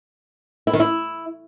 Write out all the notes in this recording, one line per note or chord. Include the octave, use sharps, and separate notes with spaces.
E4
D#3
E4